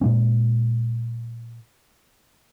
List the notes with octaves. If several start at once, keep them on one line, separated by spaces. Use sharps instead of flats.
A#2 G#3 C#4